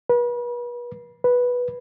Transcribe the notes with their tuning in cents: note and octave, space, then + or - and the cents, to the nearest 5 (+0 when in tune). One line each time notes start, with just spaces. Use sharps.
B4 -35
B4 -5